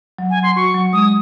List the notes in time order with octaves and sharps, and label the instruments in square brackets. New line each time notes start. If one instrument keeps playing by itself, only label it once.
[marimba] F#3
[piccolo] G#5
[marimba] F#3
[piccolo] C6
[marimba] F#4 [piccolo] C#6
[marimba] F#3
[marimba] G#3 [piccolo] D#6